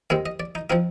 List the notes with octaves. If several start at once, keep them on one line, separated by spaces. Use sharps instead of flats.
D#2 D#3 G#3 C4 F5
D#5
D5
D#4
F3 C4 D#4 F4